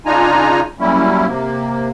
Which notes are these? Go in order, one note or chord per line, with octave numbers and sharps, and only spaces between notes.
C#3 D4 D#4 F4 G#5 A#5
F#3 G3 A#3 C#4 E4
C3 A#3